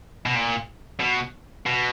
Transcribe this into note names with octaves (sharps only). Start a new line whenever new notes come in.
B2
A#2
B2
B2